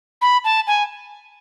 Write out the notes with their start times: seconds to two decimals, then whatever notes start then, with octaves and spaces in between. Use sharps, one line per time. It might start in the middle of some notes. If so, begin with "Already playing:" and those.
0.22 B5
0.44 A5
0.67 G#5